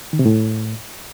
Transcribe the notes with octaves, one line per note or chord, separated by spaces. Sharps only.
D#3
C3
A2